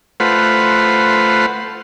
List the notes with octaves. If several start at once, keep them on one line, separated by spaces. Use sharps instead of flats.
A3 F4 B4 C5 F#5